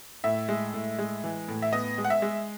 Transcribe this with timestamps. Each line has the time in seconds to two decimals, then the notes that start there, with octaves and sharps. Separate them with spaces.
0.24 A2 E5
0.48 G#3
0.74 A2
0.98 G#3
1.24 E3
1.48 A2
1.62 E5
1.72 B3 D#5
1.98 G#3
2.04 F#5
2.10 E5
2.22 G#3